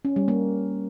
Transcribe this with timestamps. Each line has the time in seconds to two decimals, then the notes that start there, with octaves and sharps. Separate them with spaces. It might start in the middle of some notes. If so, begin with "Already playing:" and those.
0.05 C#4
0.16 G3
0.28 A#3